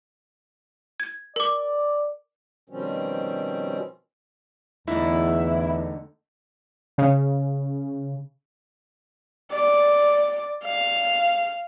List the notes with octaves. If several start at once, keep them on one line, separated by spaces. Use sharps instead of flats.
G#6
A#4 D5 D6
B2 D#3 F3 G3 C4 C#4
E2 D3 A3 D#4 E4
C#3
D5
F5